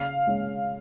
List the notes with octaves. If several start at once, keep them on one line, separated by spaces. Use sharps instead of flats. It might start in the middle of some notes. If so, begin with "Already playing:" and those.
Already playing: C#3 F5
G#3 C#4